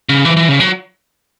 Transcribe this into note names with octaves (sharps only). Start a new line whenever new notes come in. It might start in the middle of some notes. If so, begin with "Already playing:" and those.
C#3
E3
E3
C#3
F#3